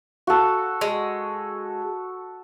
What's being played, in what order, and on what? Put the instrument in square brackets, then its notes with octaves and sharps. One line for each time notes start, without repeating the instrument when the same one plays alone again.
[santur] F#4 A4
[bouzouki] G#3